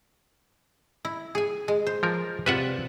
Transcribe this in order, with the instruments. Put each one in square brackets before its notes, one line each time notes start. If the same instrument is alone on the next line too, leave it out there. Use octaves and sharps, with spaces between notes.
[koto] E4
G#4 G#5
G#3
C5
[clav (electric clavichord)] F3 A#4
[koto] C3 F4 D5 [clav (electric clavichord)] B4 E5 F#5